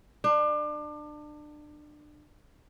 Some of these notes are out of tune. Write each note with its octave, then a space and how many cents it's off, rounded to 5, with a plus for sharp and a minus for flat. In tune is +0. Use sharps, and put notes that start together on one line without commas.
D4 +30